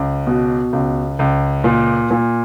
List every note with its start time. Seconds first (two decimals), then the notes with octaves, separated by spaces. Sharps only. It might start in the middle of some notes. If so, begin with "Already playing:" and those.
Already playing: C#2
0.27 B2
0.73 C#2
1.19 C#2
1.64 A#2
2.11 A#2